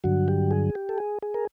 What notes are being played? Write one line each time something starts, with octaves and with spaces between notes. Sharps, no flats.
G2 D3 F#3 F#4
G4
G#4
G4
A4
G#4
G#4
A#4